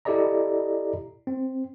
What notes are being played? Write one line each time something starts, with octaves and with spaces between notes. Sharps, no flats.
E4 G4 A4 D5 D#5 A#5
C4